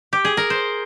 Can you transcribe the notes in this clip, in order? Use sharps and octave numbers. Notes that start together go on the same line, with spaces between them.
G4
G#4
A#4
C5